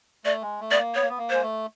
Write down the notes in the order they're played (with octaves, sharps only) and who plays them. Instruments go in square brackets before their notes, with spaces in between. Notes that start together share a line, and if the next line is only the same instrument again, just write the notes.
[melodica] A3 [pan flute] D5
[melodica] G#3
A3
[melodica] B3 [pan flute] D5
[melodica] A#3
[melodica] B3 [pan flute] C#5
[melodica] A#3
B3
A#3
[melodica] G#3 [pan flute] C5
[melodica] A3